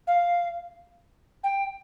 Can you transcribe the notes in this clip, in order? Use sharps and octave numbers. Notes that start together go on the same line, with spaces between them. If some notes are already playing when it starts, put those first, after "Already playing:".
F5
G5